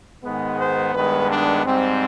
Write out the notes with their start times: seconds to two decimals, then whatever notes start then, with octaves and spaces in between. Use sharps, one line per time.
0.23 G#2 D#3 G#3 B3
0.59 C5
0.94 G2 D#3 G#3 B3 B4
1.30 D4
1.65 G#2 G3 C4